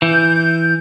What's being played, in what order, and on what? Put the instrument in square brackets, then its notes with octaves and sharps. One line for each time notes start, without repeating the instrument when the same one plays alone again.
[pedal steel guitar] E3 [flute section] G6